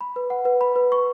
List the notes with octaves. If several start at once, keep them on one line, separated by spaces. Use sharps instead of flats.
B5
B4
F#5
B4
B5
B4
C#6